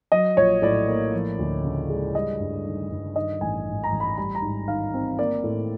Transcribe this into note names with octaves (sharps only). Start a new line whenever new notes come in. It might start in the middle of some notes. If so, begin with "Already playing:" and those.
F#3 D#5
A#1 C#5
A2 D5
A#3
F3
D2
C#3
G#3
G3 D#5
G2
D#3
G2
D#3 D#5
A1 G#5
G#2
A#5
A1
B5
G3 B5
A#5
G#2
D#3 F5
C4
A#3 D5
A2